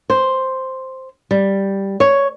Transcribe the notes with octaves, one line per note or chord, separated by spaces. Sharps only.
C5
G3
C#5